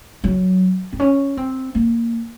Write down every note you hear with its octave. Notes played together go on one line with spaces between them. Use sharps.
F#3
C4
C#4
C4
A#3